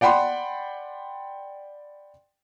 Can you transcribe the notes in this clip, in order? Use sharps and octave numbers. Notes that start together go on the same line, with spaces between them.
D5 F#5 G5 B5 C6